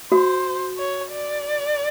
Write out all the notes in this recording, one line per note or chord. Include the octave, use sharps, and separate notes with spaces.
F#4 C5
C#5
D5